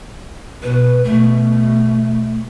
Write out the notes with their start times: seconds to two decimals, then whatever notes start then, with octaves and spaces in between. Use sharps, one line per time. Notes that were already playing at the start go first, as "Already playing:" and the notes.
0.62 B2 B4
1.04 B2 A3